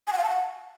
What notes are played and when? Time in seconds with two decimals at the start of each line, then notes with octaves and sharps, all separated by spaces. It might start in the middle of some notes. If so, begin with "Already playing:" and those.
0.07 G#5
0.13 F#5
0.18 F5
0.23 A5
0.29 F#5